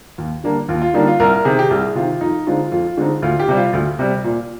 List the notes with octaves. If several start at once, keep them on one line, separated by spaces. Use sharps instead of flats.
D#2
D3 G3 A#3 D4
D#2 F4
F4
D3 G3 A#3 D4 D#4
F4
C2 A#4
C3 D#3 G#4
G4
C2 G#4
C3 D#3 F4
F2 D#4
D3 G#3 C4 D#4 F4
F2 F4
D3 G#3 C4 D#4
D2 F4
G4
C3 G3
F4
D2
C3 G3
A#2